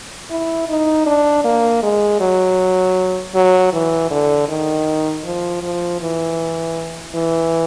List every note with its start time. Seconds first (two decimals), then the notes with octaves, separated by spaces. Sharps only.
0.31 E4
0.69 D#4
1.07 D4
1.45 A#3
1.83 G#3
2.21 F#3
3.35 F#3
3.73 E3
4.11 D3
4.49 D#3
5.25 F3
5.63 F3
6.01 E3
7.15 E3